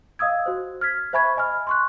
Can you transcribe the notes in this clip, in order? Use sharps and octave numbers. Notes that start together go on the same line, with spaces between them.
D#5 F5 D#6 E6 G#6
F#4 C5
F6 G#6 B6
C5 E5 G#5 B5 C#6 G#6
D#5 G#5 B5 F6
C6 C#6 F#6